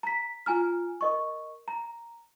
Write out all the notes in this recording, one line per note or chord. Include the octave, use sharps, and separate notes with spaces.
A#5 B6
F4 G#5 A#5 F6
A#4 D#5 C#6
A#5